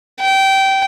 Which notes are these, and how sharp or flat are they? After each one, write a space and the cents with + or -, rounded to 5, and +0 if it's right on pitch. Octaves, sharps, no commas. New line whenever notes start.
G5 -20